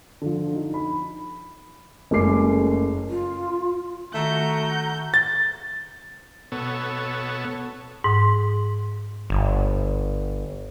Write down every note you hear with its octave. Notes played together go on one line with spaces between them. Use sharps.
D3 F3
D#4
B5
F#1 G#3 A3 C#4 D6 C7
F4
D#3 A3 F#4 A#5 G6
A6
B2 B3 A4 C#5
G#2
G1